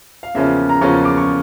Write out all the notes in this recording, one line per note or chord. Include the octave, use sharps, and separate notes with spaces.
F5
E2 C#3 F3 A#3 C#4 E5
A#5
E2 C#3 F3 A#3 C#4 C#6
D6
C#6